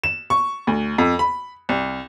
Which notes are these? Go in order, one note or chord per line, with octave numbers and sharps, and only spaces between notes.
E7
C#6
D2
F2
B5
C2